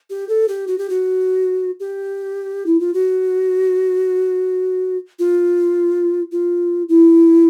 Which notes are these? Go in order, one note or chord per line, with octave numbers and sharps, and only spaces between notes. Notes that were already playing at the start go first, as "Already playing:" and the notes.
G4
A4
G4
F#4
G4
F#4
G4
E4
F4
F#4
F4
F4
E4